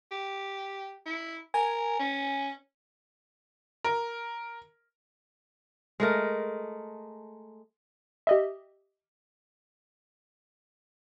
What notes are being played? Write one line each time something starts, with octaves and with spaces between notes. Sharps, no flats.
G4
E4
A#4 G#5
C#4
A#4
G#3 A3 A#4
G4 D#5 E5